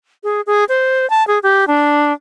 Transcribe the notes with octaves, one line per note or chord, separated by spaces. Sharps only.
G#4
G#4
C5
A5
G#4
G4
D4